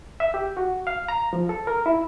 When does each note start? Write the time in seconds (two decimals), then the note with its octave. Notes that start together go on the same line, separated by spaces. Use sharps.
0.20 E5
0.34 G4
0.57 F#4
0.87 F5
1.09 A#5
1.33 F3
1.49 A4
1.67 A#4
1.86 E4